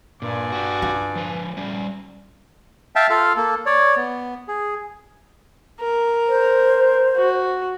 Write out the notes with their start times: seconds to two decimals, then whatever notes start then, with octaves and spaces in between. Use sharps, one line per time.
0.22 G2 A#2 D5 G#5
0.52 F#4 G4
0.82 F4
1.16 F3 B4
1.57 G3 C#4
2.96 E5 F5 G5 A5
3.10 F4 A4 F5
3.36 A#3 A4
3.66 C#5 D5
3.96 B3
4.48 G#4
5.80 A#4
6.28 C5
7.16 F#4